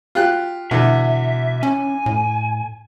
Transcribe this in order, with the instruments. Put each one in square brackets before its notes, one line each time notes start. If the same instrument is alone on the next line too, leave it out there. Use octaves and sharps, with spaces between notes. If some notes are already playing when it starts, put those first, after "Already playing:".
[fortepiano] F4 G4 F#6
[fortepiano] E2 D3 [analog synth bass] B2 [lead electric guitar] E5
[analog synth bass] C#4 [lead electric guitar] G#5
[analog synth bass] A2